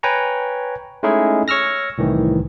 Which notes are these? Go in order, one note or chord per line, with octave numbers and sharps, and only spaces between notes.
B4 C#5 G5 G#5 A#5 C#6
G#3 A3 C#4 D#4 E4 G#4
C#5 C#6 E6 F6 A#6
C2 A2 D#3 E3